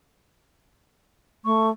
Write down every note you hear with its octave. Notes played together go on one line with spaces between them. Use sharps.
A3 C#6